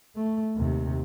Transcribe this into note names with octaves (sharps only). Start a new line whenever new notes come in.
A3
D#2 C3